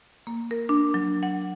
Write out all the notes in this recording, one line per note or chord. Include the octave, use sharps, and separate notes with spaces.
A#3
A#4
D4
F#3
F#5